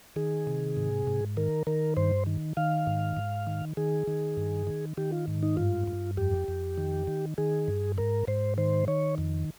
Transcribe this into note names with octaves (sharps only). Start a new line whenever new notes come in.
D#3 G#4
C3
G#2
G#2
D#3 A#4
D#3 A#4
G2 C5
D#3
D#3 F5
G#2
G#2
D#3
D#3 G#4
D#3
G2
D#3
D#3 G4
F4
G#2
D#4
G2 F4
G2
F2 G4
F2
D#3
D#3
D#3 G#4
G2
G#2 A#4
G#2 C5
D#3 C5
D#3 C#5
F2